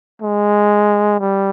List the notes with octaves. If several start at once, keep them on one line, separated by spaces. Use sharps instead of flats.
G#3
G3